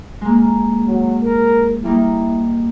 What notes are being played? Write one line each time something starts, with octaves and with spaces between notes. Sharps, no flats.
G#3 A#3
F#3
A#4
G3 A#3 D#4 E4